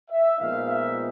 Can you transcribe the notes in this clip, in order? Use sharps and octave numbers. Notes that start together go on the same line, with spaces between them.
E5
A#2 F3 G#3 B3 D#4 F5
E5